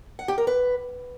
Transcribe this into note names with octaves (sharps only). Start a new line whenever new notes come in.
F#5
G4
A#4
B4